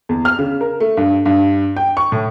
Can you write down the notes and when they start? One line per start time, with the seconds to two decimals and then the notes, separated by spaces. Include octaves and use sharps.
0.09 E2
0.25 F6
0.39 C#3
0.61 A#4
0.80 A3
0.97 G2
1.26 G2
1.76 G5
1.97 C#6
2.12 A2